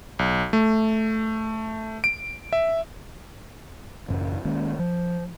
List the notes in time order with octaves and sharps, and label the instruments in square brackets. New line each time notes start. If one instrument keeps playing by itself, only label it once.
[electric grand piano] B1
A3
D7
E5
[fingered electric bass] A1 F#2 C#3
D#3 G#3 A#3 C#4
F3